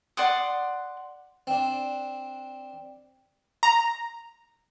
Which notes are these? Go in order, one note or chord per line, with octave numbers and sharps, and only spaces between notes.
D5 F#5 C6 D#6
C4 D4
A#5